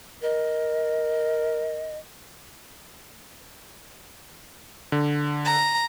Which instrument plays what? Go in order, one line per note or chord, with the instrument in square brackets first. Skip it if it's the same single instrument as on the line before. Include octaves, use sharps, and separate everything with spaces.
[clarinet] A#4 [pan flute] D#5
[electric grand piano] D3
[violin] A#5